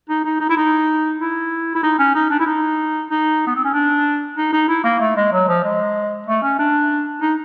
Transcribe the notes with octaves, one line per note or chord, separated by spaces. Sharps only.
D#4
D#4
D#4
E4
D#4
E4
E4
D#4
C#4
D#4
D4
E4
D#4
D#4
B3
C4
C#4
D4
D#4
D#4
E4
A#3
A3
G#3
F#3
F3
G#3
A3
C#4
D4
D#4